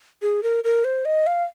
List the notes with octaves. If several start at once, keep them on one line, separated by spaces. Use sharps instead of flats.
G#4
A#4
A#4
C5
D#5
F5